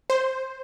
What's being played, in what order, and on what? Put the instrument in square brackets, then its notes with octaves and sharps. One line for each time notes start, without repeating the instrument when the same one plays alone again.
[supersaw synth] C5